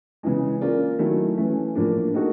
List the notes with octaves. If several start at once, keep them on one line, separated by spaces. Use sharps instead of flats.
C#3 E3 G#3
A#3 C#4 F4 A#4 D5
D#3 F#3 A3 C#4 E4
E3 A3 C#4
A2 F3 A#3 D4
A#3 D#4 F#4 A4